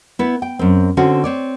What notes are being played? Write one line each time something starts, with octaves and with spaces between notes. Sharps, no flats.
B3 E4
G5
F#2 C4
D3 C4 C#4 F#4 C5
C4 C#5 D5